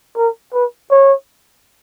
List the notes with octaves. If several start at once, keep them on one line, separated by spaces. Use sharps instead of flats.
A#4
B4
C#5